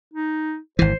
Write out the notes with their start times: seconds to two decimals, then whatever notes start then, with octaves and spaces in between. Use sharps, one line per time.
0.14 D#4
0.79 G#1 E3 C5